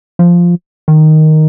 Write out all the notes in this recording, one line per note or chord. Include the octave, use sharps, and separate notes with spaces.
F3
D#3